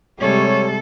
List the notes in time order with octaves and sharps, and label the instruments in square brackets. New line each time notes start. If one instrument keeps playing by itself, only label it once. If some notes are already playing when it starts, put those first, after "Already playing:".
[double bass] C3 G#3 [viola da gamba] G3 [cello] A4 [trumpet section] C#5